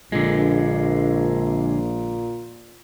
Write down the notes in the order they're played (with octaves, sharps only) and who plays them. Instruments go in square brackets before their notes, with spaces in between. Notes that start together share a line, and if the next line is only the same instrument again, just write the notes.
[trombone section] A#1 [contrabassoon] A#2 [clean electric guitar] D3 G#3